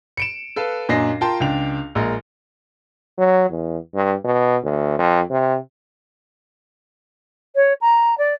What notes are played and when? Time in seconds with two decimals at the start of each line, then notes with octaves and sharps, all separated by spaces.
0.17 C#7 D7 E7
0.56 A4 B4 F5
0.89 F#2 A#2 D4 D#5 A#6 C7
1.21 F4 A#4 G5 A5 C6
1.40 C#2 D4 G5 F7
1.95 A#1 G#3 A#4
3.18 F#3
3.50 E2
3.94 G2
4.24 B2
4.64 D2
4.99 F2
5.31 C3
7.55 C#5
7.81 A#5
8.18 D5